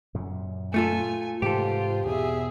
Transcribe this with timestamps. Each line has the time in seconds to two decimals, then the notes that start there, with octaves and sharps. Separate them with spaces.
0.14 F#2 A#2 C#3
0.74 A3 F4 A4 G#5
1.42 G#2 C3 E3 F4 G4 A4 C5
2.07 E2 B2 G#4 E5